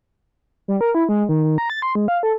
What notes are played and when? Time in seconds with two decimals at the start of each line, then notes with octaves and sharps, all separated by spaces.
0.68 G3
0.81 A#4
0.95 E4
1.09 G#3
1.29 D#3
1.43 D#3
1.58 A#5
1.70 A6
1.82 C6
1.95 G#3
2.08 F5
2.23 A4